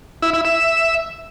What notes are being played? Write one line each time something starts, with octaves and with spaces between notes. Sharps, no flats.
E4
E4
E5